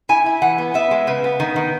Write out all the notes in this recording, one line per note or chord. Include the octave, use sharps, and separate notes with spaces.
E4 G#5
E4
E3 F#5
B3
B3 E5
G#3
C#3 B4
B3
D#3
D#3